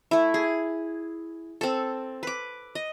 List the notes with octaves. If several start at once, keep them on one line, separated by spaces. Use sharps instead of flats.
A3 E4
G#4
C4 A4
B4 D6
D#5